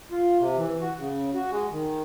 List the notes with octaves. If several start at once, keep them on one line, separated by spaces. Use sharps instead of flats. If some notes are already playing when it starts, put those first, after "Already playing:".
F4
C3
E3
F#4
C#3
F#4
G#3
D#3